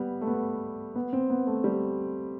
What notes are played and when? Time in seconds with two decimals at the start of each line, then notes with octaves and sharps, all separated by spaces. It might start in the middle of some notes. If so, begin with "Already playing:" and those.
Already playing: G3 B3
0.21 A3
0.27 B3
0.95 B3
1.13 C4
1.30 B3
1.47 A3
1.64 G3